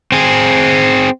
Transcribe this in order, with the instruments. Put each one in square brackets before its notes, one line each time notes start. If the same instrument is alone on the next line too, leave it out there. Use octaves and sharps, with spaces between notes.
[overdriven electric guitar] C4 G#4